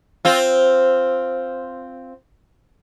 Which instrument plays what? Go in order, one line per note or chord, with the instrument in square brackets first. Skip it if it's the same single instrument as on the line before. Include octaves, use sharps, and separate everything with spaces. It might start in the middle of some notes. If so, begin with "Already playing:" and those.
[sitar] C4 F4